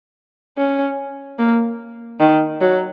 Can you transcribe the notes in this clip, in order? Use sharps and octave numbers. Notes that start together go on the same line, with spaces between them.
C#4
A#3
D#3
F#3